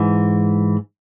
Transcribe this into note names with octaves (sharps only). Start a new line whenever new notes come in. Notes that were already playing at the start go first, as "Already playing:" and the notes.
Already playing: G#2 E3